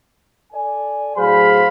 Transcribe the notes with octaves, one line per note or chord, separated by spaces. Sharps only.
A4 D5 G#5
A2 F#3 G#4 C5 F5 B5